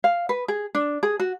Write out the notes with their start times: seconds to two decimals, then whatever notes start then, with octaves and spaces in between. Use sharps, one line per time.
0.04 F5
0.29 B4
0.48 G#4
0.75 D4
1.03 G#4
1.20 F#4